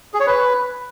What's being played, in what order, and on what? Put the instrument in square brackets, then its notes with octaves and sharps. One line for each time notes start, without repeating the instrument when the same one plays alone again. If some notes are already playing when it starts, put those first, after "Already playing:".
[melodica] G#4
C#5
B4